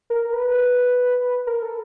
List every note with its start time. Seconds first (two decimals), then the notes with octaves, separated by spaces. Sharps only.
0.10 A#4
0.33 B4
1.47 A#4
1.62 A4